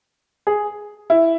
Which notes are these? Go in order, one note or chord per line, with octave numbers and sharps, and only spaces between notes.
G#4
E4